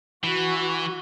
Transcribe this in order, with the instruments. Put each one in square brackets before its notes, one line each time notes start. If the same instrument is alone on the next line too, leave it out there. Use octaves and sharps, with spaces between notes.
[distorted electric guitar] E3 [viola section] F#4